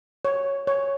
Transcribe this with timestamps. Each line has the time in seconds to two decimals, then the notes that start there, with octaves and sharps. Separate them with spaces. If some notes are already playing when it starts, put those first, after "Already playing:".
0.25 C#5
0.67 C#5